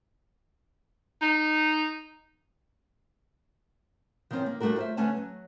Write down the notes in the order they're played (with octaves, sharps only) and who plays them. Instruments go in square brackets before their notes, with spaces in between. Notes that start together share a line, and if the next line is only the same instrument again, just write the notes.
[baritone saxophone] D#4
[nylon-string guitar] D#3 F3 G3 C4 C#4 F4
A#3
D#2 G3 A3 D4 F#4 A#4
F4 C5 E5
D3 A3 B3 C#4 G#5 A5
F#3